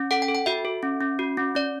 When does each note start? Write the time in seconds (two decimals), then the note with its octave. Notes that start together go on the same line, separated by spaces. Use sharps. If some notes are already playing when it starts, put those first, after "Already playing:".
Already playing: C#4
0.11 A4 F#5
0.22 G5
0.28 A4
0.35 G5
0.46 F#4 E5
0.65 A4
0.83 C#4
1.01 C#4
1.19 F#4
1.37 C#4
1.55 C#4 D5